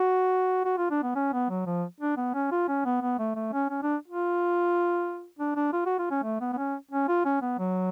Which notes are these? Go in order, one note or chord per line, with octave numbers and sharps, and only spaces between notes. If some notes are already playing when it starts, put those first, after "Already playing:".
Already playing: F#4
F#4
F4
D4
B3
C#4
B3
F#3
F3
D4
B3
C#4
F4
C#4
B3
B3
A3
A3
C#4
C#4
D4
F4
D4
D4
F4
F#4
F4
C#4
A3
B3
B3
C#4
C#4
F4
C#4
B3
F#3